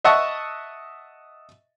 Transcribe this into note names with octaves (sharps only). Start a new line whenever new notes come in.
D#5 E5 F#5 A5 C#6 D#6